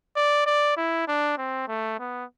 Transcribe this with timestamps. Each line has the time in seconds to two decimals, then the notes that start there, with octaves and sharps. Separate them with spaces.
0.16 D5
0.46 D5
0.77 E4
1.07 D4
1.38 C4
1.68 A3
1.99 B3